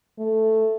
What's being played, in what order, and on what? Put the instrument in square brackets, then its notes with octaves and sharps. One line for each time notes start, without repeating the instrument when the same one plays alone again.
[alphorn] A3